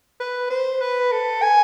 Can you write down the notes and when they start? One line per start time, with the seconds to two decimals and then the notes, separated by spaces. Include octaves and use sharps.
0.20 B4
0.50 C5
0.81 B4
1.12 A4
1.42 G#5